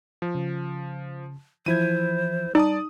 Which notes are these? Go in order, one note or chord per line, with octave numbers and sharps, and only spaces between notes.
F3
C#3
E3 F3 E4 C5 G#6 D#7
G3 D#4 D5 A5 D#6